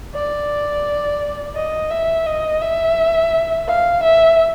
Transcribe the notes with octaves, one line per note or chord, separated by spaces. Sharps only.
D5
D#5
E5
D#5
E5
F5
E5